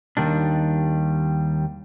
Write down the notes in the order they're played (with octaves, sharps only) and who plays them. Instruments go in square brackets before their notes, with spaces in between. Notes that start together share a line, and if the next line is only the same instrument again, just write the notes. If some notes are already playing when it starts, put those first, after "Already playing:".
[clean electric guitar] D#2 D#3 G3 D4